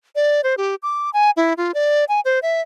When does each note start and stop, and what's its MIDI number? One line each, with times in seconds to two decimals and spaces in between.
0.16 0.41 74
0.44 0.55 72
0.57 0.75 67
0.83 1.10 86
1.13 1.30 80
1.37 1.53 64
1.57 1.72 65
1.74 2.04 74
2.09 2.20 80
2.25 2.39 72
2.42 2.61 76